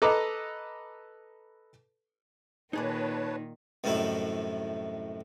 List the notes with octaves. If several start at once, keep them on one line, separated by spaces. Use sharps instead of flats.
A4 B4 D#5 A#5 D6
A#2 D#3 D#4 G#4 B4 C#5 D5 A5
C2 F#2 A2 D#3 E4